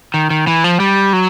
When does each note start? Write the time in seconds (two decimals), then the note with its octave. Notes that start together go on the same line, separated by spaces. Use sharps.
0.14 D#3
0.30 D#3
0.47 E3
0.64 F3
0.80 G3
1.13 F#3